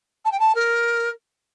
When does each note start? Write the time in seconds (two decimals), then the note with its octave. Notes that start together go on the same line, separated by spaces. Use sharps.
0.25 A5
0.31 G5
0.39 A5
0.55 A#4